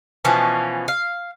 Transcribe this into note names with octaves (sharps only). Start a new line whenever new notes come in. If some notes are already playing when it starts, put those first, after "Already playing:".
B2 E3 F3 C#4
F5